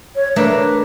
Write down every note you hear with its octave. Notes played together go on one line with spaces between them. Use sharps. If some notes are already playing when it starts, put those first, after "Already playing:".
C#5
A3 A#3 D4 B4